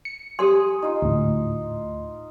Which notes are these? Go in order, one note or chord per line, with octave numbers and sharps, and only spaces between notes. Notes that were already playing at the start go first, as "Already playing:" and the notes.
C#7
G4 A4 G#5 C6 D#6 E6
D#4 F4
D2 A2